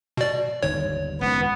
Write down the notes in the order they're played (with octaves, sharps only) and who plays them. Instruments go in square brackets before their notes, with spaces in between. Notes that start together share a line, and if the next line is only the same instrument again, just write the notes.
[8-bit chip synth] B2 D5
[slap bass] G1 D#2 G#2 [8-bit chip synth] C#5
[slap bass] G#1 C#2 F#2 [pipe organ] B3